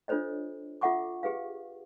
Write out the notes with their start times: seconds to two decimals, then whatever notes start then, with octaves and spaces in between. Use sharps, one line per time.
0.08 D4 F4 A4 C5 C#5 D#5
0.81 F4 A4 E5 F#5 C#6 D6
1.23 G4 G#4 B4 F5